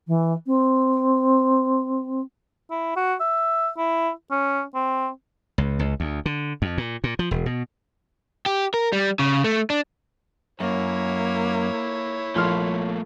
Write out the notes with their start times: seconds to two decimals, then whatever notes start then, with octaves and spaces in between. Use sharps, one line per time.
0.07 E3
0.46 C4
2.71 E4
2.96 F#4
3.20 E5
3.77 E4
4.31 C#4
4.75 C4
5.58 C#2
5.79 C#2
6.00 D2
6.26 D3
6.62 F2
6.78 A#2
7.04 A#2
7.19 F3
7.31 E1
7.46 B2
8.46 G4
8.74 A#4
8.93 G3
9.19 C#3
9.44 A3
9.70 D4
10.60 F#2 A#3 E4 C#5
12.35 A#1 A3 A#3 C6 F6